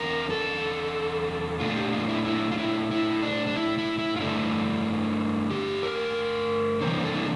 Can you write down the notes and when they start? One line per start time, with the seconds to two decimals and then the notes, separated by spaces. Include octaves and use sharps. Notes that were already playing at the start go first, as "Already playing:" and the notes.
Already playing: E2 D3 F3 C4 A#4
0.30 A4
1.60 A#2 A3 D4 F4
1.76 G4
1.93 F4
2.09 E4
2.25 E4
2.52 F4
2.58 E4
2.91 E4
3.23 D4
3.47 D4
3.56 E4
3.78 E4
3.99 E4
4.16 F4
4.20 G2 D3 A3 D4 E4
5.50 G4
5.83 A#4
6.81 C3 E3 G3 A#3 D4 C5
7.04 A4
7.15 E4